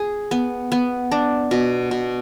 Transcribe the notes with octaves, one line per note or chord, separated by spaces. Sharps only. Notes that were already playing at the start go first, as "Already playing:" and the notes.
Already playing: G#4
B3
B3
D4
B2
B2